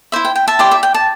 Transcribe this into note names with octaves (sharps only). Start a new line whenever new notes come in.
E4 C5 E5
G5
G5
E5 A5
E4 G4 D5 G5 C6
E5
G5
A5